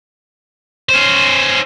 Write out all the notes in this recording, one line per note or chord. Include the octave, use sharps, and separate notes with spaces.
C#4 C5